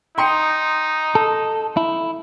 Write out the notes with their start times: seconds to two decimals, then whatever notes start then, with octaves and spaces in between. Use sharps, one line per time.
0.18 D#4 G5 C6 C#7
1.15 A4
1.77 E4